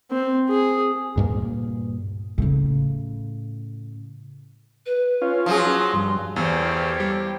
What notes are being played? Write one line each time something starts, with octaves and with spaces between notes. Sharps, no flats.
C4
G#4
D2 G2 A#2 A#3
A2 C#3
B4
C#4 F4
F3 F#3 G#4 C6
G2
E2 G4 A4 C5 C#5 F5
G3